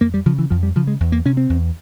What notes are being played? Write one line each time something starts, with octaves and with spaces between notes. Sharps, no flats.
F2 A#3
G3
C#3 F3
E3
F2 F3
G3
C#3 F3
G#3
E2
A#3
C3 C#4
C4
E2